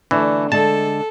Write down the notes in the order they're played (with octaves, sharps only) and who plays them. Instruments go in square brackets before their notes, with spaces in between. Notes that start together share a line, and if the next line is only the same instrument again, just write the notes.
[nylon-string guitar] D3 D4 [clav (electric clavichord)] E3 [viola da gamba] A3
[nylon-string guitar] D3 G#3 [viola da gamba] A4 [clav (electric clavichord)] A5